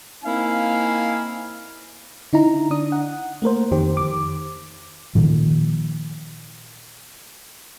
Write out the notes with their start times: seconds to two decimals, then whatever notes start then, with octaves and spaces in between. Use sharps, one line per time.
0.24 A#3 C4 D#4 E4 F5 G#5
2.33 D3 D#4 E4 A#5
2.71 D4 D#6
2.92 F#5
3.42 A3 A#3 A#4 C5
3.71 F2 D#3 G4 C5
3.97 D#3 D6
5.15 A#2 D#3 F3